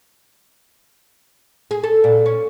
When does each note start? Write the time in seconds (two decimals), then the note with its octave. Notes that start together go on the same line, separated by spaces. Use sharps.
1.71 G#4
1.84 A4
2.04 A#2
2.26 C#4